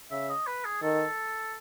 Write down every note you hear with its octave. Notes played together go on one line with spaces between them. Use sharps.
C#3 E5
D#5
B4
G#4
D#3 A4